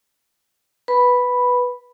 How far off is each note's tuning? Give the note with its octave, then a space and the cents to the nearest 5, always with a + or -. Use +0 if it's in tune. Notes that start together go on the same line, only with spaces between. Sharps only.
B4 +0 B5 +0